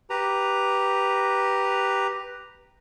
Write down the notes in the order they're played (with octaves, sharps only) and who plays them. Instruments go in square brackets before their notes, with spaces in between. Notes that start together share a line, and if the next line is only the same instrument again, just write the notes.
[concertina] G4 B4 A#5